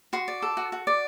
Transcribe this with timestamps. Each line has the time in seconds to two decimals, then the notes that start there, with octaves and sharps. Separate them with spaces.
0.13 F#4 C6
0.28 D5
0.42 A4
0.57 F#4
0.72 F#4
0.87 D5